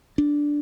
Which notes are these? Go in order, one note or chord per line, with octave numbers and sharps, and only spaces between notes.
D4